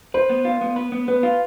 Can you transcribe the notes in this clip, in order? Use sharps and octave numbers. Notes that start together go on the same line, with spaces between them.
B4 C5
B3
F4
B3
B4
B3
B3 B4
F4